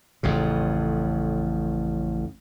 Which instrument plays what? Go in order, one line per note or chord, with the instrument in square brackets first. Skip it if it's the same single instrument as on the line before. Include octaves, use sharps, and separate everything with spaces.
[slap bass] A1 F2 C#3